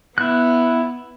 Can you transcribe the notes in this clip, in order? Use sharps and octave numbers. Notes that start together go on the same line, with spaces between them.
B3 E4 F#6